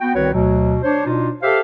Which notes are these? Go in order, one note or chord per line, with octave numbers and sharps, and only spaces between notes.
B3 F#4 G5
C2 D#3 C4 F#4 B4 C#5
D2 B2 F#3
D4 C5 C#5
B2 D4 D#4 F4
G4 A4 C5 E5 F5